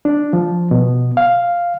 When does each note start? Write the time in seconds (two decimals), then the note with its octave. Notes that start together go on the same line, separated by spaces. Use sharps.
0.05 D4
0.33 F3
0.71 B2
1.17 F5